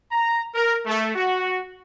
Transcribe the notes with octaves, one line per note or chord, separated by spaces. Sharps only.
A#5
A#4
A3
F#4